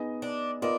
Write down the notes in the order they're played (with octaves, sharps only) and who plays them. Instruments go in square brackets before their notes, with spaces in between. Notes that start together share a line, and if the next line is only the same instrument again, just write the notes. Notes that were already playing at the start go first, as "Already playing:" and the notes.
Already playing: [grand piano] B3 D#4 G#4 D#5
[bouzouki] D4
[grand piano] B3 F4 A#4 D#5 [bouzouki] D4